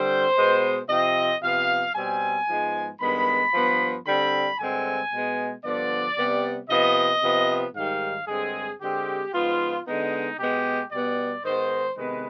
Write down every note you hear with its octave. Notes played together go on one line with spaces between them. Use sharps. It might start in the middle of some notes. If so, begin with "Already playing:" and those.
Already playing: D3 G3 C4 C5
B2 G#3 B3
C3 F3 C4 D#5
C3 F3 B3 F5
B2 G3 C4 G#5
G#2 F3 G#3 B3
G2 D#3 G#3 B3 B5
G2 F3 B3
D3 G3 C4 B5
G2 D3 G#3 C4 G#5
B2 G#3 B3
G2 D3 F3 B3 D5
C3 G3 B3
C3 F3 B3 D#5
C3 F3 B3
G#2 D#3 G3 F5
G2 D3 G#3 C4 G#4
D3 G#3 C4 G4
G#2 F3 B3 F4
D3 G#3 B3 D#4
B2 G#3 B3 G4
B2 G3 B3 D5
G#2 D#3 G#3 B3 C5
C3 D#3 G#3 B3 B4